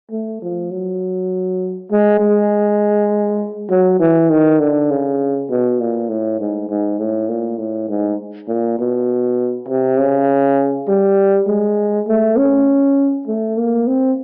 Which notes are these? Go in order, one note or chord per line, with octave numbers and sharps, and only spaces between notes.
A3
F3
F#3
G#3
G#3
F#3
E3
D#3
D3
C#3
B2
A#2
A2
G#2
G#2
A2
A#2
A2
G#2
A#2
B2
C3
C#3
G3
G#3
A3
C#4
A3
A#3
C4